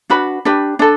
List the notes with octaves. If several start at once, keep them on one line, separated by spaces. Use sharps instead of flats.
D4 F#4 B4 B5
D4 G4 B4
D4 A4